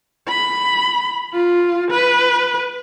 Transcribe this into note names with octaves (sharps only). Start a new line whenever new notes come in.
B5
F4
B4